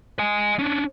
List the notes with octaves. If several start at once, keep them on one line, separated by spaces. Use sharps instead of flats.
D#5 G#5
C#4 D4